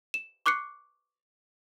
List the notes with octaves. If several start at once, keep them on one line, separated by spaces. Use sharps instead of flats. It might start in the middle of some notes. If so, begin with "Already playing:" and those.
E7
C#6 D6 F#6 C7 C#7